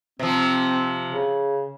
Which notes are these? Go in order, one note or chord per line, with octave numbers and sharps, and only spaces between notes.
C3 F3 C4
C#3